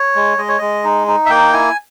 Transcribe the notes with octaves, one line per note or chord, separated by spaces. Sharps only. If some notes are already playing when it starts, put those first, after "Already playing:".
Already playing: C#5
G#3
G#3 D#5
C#5
G#3 D#5
D#4
D#4
E5
A#3 G5
E4 G#5